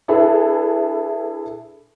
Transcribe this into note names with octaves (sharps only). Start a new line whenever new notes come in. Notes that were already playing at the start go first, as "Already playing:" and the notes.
D4 E4 G#4 A4 B4 E5